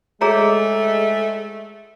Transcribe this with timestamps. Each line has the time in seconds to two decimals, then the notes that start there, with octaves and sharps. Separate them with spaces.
0.21 G#3 A3 G#4 C#5 A#5